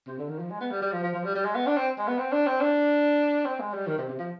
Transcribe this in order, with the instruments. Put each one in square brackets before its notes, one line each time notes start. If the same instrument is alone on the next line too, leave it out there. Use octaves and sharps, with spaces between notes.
[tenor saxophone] C3
D3
D#3
F3
G#3
B3
G3
G3
F3
F3
F3
G3
G3
G#3
B3
D4
C4
G#3
B3
C4
D4
C4
D4
C4
G#3
G3
D#3
C3
C3
F3